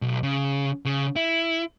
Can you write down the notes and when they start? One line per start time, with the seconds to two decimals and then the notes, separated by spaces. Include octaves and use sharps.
0.02 B1
0.23 C#3
0.85 C#3
1.16 E4